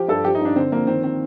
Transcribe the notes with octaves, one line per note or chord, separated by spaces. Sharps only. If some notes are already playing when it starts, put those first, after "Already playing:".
Already playing: F3 G4
G2 A4
F3 G4
D#4
G2 D4
D3 C4
F3 A#3
D#3 C4
C4